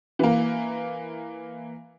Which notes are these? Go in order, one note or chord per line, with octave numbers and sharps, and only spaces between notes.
E3 A#3